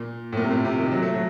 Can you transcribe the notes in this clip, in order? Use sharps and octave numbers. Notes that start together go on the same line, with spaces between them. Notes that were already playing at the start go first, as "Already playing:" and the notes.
Already playing: A#2
A2
A#2
C3
A#2
C3
D#3
F#3
A3
F#3